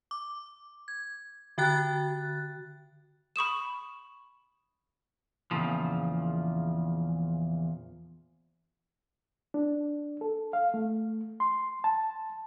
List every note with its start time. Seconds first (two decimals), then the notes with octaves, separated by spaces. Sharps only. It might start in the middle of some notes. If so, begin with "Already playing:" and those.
0.11 D6
0.88 G#6
1.58 D3 F#4 G5 F#6 A6
3.36 B5 C#6 D#6 E7
5.51 E2 A#2 C#3 F3
9.54 D4
10.21 A4
10.53 F5
10.74 A3
11.40 C6
11.84 A5